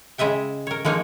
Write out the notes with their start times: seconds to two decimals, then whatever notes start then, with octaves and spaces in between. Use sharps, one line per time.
0.18 C#3 G#3 D#5 E5 G5
0.67 A#4 C#5
0.85 F3 G#3 A#3 D#4 C#5